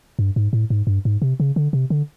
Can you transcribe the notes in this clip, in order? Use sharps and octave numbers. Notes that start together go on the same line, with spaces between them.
G2
G#2
A2
G#2
G2
G#2
C3
C#3
D3
C3
D3